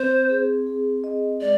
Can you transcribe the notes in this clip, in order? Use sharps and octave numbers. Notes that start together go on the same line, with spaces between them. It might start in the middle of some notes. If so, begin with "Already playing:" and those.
Already playing: C4 C5
G#4
G#4
D#5
G#3 D5